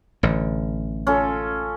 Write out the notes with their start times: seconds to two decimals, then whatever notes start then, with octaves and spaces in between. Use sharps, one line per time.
0.23 A1 D3
1.07 C#4 F4 A4